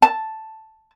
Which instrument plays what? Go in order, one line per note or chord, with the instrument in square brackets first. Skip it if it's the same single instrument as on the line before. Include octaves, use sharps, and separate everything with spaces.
[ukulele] A5